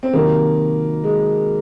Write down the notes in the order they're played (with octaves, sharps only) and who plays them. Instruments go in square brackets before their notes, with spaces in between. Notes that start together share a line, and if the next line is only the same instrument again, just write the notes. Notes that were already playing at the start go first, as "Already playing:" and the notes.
[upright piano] C4
[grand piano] C3 D#3 F#3 [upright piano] A#3
[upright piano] G#3